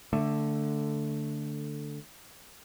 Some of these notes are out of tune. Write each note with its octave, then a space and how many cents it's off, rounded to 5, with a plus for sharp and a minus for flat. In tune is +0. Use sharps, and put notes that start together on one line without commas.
D3 +0 A3 +5